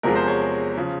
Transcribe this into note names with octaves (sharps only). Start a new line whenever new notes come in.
E2 C3 F3 G#3 A#4
C5
C#5
C#3 F3